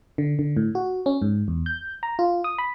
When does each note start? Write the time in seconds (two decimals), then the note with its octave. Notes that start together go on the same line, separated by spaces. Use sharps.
0.18 D3
0.39 D3
0.57 A2
0.75 F#4
1.06 C#4
1.22 G#2
1.48 E2
1.66 G6
2.03 A#5
2.19 F4
2.44 D#6
2.58 B5